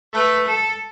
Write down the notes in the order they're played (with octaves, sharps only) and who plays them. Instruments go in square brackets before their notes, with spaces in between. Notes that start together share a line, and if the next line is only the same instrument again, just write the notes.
[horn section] A3 [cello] B4
[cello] A4